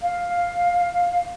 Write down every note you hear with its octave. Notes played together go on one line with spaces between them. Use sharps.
F5